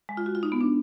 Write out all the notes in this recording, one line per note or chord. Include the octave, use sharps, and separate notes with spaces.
G#3
F4
F#4
F4
D#4
B3
D4